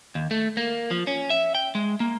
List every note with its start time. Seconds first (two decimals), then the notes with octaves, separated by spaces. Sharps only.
0.15 D#2
0.31 A3
0.57 A#3
0.91 F3
1.07 C#4
1.30 E5
1.55 G5
1.75 G#3
2.00 A#3